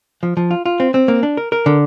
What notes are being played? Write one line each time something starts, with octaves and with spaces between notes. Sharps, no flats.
F3
F3
F4
F4
C4
C4
A#3
D4
A#4
A#4
D3